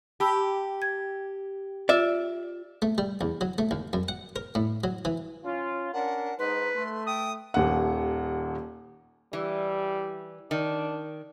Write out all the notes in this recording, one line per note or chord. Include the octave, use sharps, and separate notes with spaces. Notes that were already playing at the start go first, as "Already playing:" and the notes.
G4 A5 B5 E6
G#6
F4 D5 E5
A3
G3
E2
F#3
A3
D#2
F#2
F#5
A#4
A2
F#3
E3
C#4 F4
C#4 D4 A#4 F#5
G#2 D#4 B4 C6
A3 C6
G5 D#6
D#1 D#2 F#5
E3 G3
D#3 D4